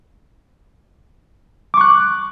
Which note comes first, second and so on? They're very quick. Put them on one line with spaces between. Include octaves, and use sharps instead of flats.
D6 C#6 F#6